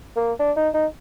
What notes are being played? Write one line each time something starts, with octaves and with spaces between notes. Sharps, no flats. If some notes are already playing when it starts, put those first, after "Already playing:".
A#3
D4
D#4
D#4